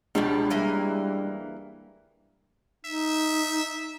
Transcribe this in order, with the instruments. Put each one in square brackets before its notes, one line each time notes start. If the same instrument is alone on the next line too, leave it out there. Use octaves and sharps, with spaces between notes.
[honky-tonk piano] C#2 [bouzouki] B2 F3 G3 [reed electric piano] D4
[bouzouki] E3 A#3 G#5 [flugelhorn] G3
[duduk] D#4 [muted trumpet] E5